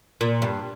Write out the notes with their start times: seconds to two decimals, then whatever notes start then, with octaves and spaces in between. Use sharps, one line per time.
0.21 A#2
0.42 G2